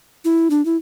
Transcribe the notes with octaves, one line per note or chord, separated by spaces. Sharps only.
E4
D4
E4